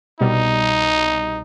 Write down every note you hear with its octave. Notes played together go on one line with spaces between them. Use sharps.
C2 B2 G3 D#4